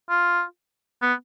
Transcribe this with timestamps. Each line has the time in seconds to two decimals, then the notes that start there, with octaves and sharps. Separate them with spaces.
0.10 F4
1.02 B3